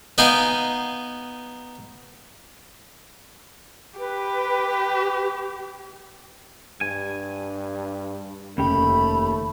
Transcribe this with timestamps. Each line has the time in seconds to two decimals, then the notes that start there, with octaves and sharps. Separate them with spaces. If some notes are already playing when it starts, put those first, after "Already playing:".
0.18 B3 D#4 F5 G5 G#5
3.99 G4 B4
6.81 G2 G#5
8.58 F1 D#2 C#3 A3 C#4 G4 B5